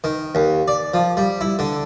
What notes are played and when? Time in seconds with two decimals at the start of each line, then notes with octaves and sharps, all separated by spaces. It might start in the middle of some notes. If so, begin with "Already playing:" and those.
0.04 D#3
0.35 D#2
0.68 D5
0.94 F3
1.17 G3
1.41 E4
1.59 D3